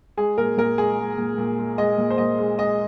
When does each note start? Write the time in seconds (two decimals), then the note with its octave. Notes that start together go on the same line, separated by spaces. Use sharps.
0.17 G#3 G#4
0.38 A#2 A#4
0.57 A#2 A#4
0.78 G#3 G#4
0.99 G#3
1.18 A#2
1.38 A#2
1.59 G#3
1.78 G#3 D#5
1.98 A#2
2.10 C5
2.18 A#2 D#5
2.38 G#3
2.58 G#3 D#5